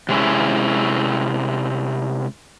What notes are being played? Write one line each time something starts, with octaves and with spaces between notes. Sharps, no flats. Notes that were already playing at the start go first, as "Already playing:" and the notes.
C3 G#3 C#4 E4